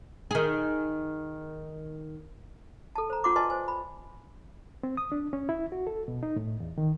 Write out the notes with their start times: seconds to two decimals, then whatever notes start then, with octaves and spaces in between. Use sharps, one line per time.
0.31 D#3 G#4
2.95 A4 A5
3.10 C5 A#5
3.24 C#4 F4 F#5 C6 D6
3.36 B4 D5 D#5 G#5 A5 C6
3.50 C5 G#5
3.68 B5
4.83 C4
4.97 D#6
5.12 D4
5.33 C#4
5.49 E4
5.72 F#4
5.87 A4
6.08 B2
6.23 D#4
6.36 A2
6.60 E2
6.78 D#3